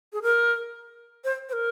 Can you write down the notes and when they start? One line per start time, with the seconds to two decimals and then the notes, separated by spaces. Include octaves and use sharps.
0.13 G#4
0.22 A#4
1.24 C5
1.49 C5
1.53 A#4